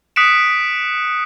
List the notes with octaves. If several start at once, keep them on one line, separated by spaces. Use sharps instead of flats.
D#6 F#6 B6 C#7 D7 E7